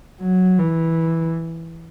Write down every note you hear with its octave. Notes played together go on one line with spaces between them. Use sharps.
F#3
E3